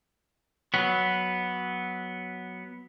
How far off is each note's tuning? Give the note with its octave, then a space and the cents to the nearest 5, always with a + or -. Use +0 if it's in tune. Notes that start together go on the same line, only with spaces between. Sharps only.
F#3 +0 B3 -5